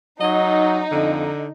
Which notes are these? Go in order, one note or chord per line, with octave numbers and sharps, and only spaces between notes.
F#3 D#4 D#5
F2 D3